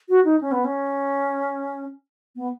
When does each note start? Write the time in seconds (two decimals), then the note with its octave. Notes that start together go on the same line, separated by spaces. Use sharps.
0.09 F#4
0.25 D#4
0.41 C#4
0.52 B3
0.65 C#4
2.36 B3